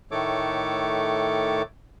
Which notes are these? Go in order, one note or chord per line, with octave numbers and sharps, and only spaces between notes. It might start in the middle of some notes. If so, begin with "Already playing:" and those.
A2 D#3 A3 A4 C#5 D6